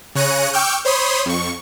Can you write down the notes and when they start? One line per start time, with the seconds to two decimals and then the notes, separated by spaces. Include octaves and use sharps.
0.15 C#3 C#5 F#6 A#6 C#7 D#7
0.53 G5 C#6 D6 E6 F6 G6
0.85 C5 C#5 B5 C6 D#6
1.26 F2 C#6